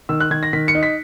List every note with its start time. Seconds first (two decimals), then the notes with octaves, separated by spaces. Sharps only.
0.09 D#3 E6
0.20 F#6
0.31 D#3 G#6
0.43 A#6
0.53 D#3 B6
0.68 C#7
0.75 D#4
0.83 B6